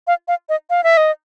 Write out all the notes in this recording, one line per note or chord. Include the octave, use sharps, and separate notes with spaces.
F5
F5
D#5
F5
E5
D#5